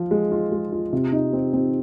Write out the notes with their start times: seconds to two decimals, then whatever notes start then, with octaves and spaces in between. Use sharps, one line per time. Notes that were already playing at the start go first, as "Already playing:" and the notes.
Already playing: F3 F4
0.11 G#3
0.32 F4
0.52 G#3
0.72 F4
0.93 C3
1.13 D#4
1.33 C4
1.53 C4